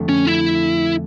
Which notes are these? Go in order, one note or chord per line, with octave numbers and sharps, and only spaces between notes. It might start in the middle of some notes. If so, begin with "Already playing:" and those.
Already playing: F2 D3 A3
C#4
E4